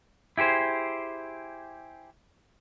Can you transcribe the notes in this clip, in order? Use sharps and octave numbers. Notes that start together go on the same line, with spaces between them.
E4 G4 G#4 C5